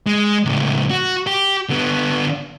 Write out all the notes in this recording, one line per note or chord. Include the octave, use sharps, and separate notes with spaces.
G#3
C#2 A2
F#4
G4
D3 B3